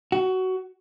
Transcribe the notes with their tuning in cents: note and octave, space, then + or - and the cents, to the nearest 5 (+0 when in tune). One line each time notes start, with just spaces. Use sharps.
F#4 +15